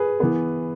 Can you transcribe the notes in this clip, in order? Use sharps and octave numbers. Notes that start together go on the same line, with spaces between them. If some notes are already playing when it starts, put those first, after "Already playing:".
Already playing: G#4 B4
E3 B3